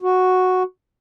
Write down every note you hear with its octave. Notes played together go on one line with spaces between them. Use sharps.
F#4